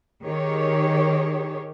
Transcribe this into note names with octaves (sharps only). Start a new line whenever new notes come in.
D#3 G4 G#4 C#5